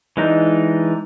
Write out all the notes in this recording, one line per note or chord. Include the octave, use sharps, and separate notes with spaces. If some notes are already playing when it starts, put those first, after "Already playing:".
E3 G#3 D4 D#4